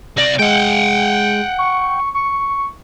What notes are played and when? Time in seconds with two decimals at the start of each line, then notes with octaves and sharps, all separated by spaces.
0.17 C2 D5 A#6
0.39 G#3 F#5 G5
1.59 C#6
2.15 C#6